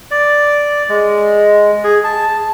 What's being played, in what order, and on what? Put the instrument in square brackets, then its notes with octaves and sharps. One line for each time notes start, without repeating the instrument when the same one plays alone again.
[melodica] D5
G#3
G#4
A5